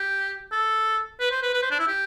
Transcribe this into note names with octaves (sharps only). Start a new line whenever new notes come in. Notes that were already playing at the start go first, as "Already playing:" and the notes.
Already playing: G4
A4
B4
C5
B4
B4
C5
D4
E4
G4